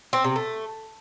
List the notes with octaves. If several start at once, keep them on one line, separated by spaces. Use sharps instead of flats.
C4
C3
A3